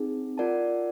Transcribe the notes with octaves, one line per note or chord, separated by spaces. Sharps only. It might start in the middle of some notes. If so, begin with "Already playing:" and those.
Already playing: C4 D#4 G#4
F4 A#4 D5 F#5 A5